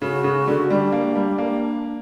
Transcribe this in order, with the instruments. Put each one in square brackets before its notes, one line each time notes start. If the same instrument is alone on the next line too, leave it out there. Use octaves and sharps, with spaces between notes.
[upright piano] C#3 [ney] F#4
[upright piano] C#3
D3
[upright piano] G3 [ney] D4
[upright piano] A#3
G3
A#3